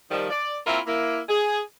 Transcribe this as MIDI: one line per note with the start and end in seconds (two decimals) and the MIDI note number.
0.11 0.27 51
0.11 0.27 53
0.11 0.27 55
0.30 0.57 74
0.66 0.79 58
0.66 0.79 60
0.66 0.79 64
0.66 0.79 65
0.66 0.79 70
0.66 0.79 76
0.86 1.20 58
0.86 1.20 64
1.29 1.59 68